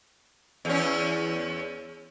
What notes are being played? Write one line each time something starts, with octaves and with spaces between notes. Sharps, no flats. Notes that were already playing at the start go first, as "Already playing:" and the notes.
E2 C#4